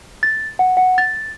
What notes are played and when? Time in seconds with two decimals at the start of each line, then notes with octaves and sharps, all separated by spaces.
0.23 A6
0.59 F#5
0.77 F#5
0.98 A6